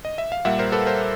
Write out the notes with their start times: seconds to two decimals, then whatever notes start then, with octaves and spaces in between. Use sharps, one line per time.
0.05 D#5
0.18 E5
0.32 F5
0.45 A#2 G3 A#3 E5 F#5
0.59 A#4 C5
0.72 A4 B4
0.86 A#4 C5